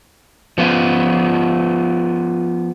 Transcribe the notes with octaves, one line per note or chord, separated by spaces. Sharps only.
F3 B3 F4